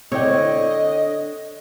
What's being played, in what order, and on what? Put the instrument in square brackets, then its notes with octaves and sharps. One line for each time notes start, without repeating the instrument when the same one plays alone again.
[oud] D3 [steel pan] C4 E4 G5 [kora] C#5 [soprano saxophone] D#5